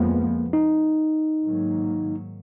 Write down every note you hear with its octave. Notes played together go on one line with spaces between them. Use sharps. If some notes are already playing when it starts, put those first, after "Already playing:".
Already playing: F2 F3 G#3 A#3 B3
D#4
G#2 D#3 F#3 A#3